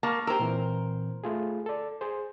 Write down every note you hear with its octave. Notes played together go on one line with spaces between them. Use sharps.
A#3 A5 C#6 F6
G4 A#4 C5 E6
A#2 E3 C4
A3 F4 G#4
A4 D5
G#4 C5